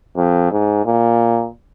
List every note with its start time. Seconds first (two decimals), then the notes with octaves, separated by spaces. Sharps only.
0.17 F2
0.51 G#2
0.86 A#2